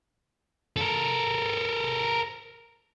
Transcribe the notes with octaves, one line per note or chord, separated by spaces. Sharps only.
A4 A#4